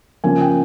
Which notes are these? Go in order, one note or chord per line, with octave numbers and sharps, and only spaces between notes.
C#3 F3 A#3 C#4 G#5
G5